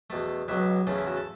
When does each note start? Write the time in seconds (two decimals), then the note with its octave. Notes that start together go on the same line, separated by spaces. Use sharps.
0.10 E2 B2 A3
0.48 C#2 B2 F#3 B3 B4 E5
0.87 E2 C#3 A3 C#4
0.97 E4
1.07 F#4
1.16 A4